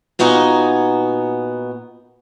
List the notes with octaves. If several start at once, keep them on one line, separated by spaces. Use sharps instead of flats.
A#2 B3 D#4 F#4 D#5 G#5